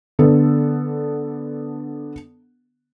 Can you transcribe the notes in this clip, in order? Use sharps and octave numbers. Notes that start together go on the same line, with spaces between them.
D3 B3 A4